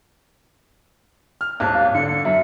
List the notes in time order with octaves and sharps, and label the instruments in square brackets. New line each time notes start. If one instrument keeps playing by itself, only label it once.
[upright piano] F6
[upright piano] D#1 G#1 A5 [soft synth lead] F#6
[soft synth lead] F5
[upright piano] D3 [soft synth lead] C#7
[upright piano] F#2 [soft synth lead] E5